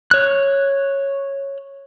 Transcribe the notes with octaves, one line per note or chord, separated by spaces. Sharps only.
C#5 F#6